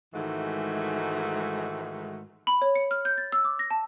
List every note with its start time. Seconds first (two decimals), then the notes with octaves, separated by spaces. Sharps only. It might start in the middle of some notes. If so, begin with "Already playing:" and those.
0.14 G#2 D#3 E3 G#3 A3 F#4
2.47 B5
2.62 C#5
2.75 C#7
2.91 F6
3.05 G6
3.18 A6
3.32 E6
3.44 D6
3.59 A#6
3.71 A5